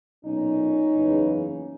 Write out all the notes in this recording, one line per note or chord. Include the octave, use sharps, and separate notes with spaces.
B1 A#2 C#4 D#4
F#1 E2 C#3 E3